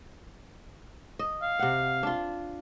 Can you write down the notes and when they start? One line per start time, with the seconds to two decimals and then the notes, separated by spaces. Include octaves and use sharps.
1.19 D#5
1.42 F5
1.59 C3 F#5
2.03 D4 F4